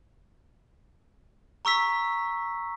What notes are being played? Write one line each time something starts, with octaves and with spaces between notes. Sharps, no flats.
A#5 C#6 E6 B6